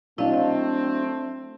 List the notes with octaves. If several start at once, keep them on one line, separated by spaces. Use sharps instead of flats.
F#3 A3 C4 D4 E4 D#5 F5